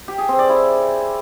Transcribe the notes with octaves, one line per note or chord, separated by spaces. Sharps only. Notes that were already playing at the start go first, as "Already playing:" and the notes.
G4
G#4
C4
D5
E4